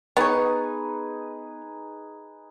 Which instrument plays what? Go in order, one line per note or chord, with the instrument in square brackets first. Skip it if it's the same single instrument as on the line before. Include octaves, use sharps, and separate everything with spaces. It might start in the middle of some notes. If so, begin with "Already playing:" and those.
[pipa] B3 C#5 [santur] D#4 G#4 B4